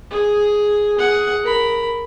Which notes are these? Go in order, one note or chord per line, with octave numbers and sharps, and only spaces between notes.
G#4
G#4 F#5
A#4 B5